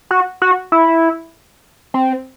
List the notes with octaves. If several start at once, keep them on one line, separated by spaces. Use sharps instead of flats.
F#4
F#4
E4
C4